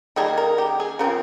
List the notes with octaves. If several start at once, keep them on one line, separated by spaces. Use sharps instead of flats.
D#3 G3 A#3 G#4
A#4
G4
G#4
C#3 F3 C4 A#4